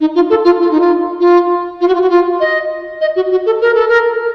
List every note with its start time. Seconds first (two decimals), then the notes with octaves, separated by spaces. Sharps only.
0.01 D#4
0.15 F4
0.30 A4
0.45 F4
0.60 F4
0.71 D#4
0.80 F4
1.20 F4
1.81 F4
1.88 F#4
1.95 F4
2.02 F#4
2.10 F4
2.40 D#5
3.01 D#5
3.16 F#4
3.31 F#4
3.46 A4
3.61 A#4
3.74 A4
3.88 A#4